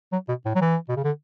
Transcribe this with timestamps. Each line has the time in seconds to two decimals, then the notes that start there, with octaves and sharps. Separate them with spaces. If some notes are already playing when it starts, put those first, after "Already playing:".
0.12 F#3
0.28 B2
0.46 A2
0.55 F#3
0.61 E3
0.88 B2
0.96 C#3
1.04 D3